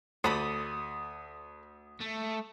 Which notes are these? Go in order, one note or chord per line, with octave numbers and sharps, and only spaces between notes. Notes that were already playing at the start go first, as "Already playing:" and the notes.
D2 A4 B5 D6 D#6
A3